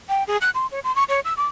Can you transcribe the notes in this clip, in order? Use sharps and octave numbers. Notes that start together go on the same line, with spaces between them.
G5
G#4
F#6
C6
C#5
C6
C#6
C#5
E6
D6